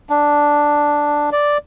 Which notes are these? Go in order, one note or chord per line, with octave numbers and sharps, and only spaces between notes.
D4
D5